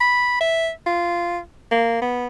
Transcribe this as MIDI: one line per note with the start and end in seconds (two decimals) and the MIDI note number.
0.01 0.37 83
0.41 0.70 76
0.86 1.39 65
1.72 1.97 58
2.02 2.27 59